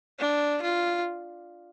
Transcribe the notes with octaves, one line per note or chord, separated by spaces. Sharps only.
D4
F4